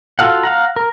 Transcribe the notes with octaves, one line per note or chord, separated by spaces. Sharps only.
F4 F#4 A4 F5 F#5
F5 F#5 A#5
A#4